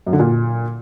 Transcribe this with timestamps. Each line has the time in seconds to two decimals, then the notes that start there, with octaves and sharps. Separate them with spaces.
0.07 F#2
0.13 D3
0.19 A#2